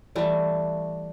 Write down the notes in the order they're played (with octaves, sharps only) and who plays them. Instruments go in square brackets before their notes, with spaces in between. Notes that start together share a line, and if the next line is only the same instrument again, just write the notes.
[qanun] E3 G3 A3